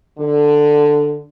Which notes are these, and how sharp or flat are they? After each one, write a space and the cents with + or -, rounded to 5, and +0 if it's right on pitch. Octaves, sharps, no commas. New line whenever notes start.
D3 +5